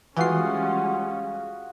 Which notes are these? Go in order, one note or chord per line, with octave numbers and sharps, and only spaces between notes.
E3 G3 G#3 C#4 F4 F#4 D#6 C7